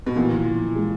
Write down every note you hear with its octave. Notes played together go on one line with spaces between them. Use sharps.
B2
A#2 E3
E3
E3
E3
G#3